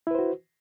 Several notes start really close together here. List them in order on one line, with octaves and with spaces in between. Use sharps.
E4 B4 C5 F#4